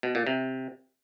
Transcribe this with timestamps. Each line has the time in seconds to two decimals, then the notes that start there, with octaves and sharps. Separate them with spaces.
0.03 B2
0.15 A#2
0.27 C3